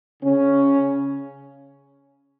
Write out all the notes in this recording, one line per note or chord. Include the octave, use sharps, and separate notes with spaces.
C#3 C#4